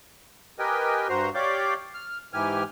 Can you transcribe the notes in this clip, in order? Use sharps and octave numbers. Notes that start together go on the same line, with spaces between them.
G4 A#4 B4 D#5 G5 G#5
G2 F#4 C5 A#5 C6
G4 C#5 D5 F5 D6 G6
F6
G#2 E3 G4 G#5 F6